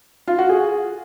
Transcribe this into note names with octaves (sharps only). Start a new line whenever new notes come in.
F4
F#4
G#4